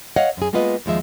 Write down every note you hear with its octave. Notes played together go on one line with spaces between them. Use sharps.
C#5 D#5 F5 F#5
F#2 G#4
G#3 A#3 B3 F4 B4 D#5
D#2 F3 G#3 E5